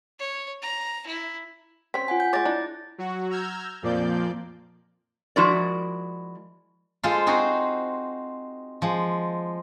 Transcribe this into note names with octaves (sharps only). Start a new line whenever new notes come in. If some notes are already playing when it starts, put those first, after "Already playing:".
C#5
A#5
E4
C4 C#4 B6
F4 F#5 G#5
G6
G#3 C#5 D6 A6 A#6
D4 E4
F#3 F#4
A#5 E6 F6 G6 G#6
F2 A#2 F3 A#3 D5 G6
F3 G#3 E4 F#4 A#4 D5
G#3 F4 A4 C5
C4 D#4 F#4 G#4 C5
F3 G#3